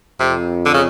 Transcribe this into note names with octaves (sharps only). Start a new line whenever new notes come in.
F2 C3
D3
C#3